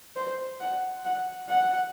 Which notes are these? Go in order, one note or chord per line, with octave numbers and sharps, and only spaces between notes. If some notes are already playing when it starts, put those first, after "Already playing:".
C5
F#5
F#5
F#5